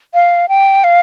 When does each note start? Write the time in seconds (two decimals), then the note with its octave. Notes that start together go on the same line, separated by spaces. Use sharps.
0.14 F5
0.49 G5
0.84 F5